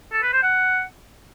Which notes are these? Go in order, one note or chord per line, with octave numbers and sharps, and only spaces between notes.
A4
B4
C5
F#5